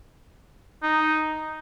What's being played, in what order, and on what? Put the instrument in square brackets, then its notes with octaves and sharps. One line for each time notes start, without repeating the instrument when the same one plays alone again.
[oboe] D#4